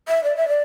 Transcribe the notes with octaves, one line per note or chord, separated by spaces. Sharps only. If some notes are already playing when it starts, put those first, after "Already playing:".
E5
D5
E5
D5